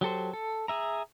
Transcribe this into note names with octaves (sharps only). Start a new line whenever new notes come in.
F#3 G4 A4 C5
A4
G#4 E5 A#5